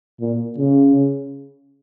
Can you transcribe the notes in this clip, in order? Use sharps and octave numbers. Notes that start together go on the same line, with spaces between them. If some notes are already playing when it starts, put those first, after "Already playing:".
A#2
C#3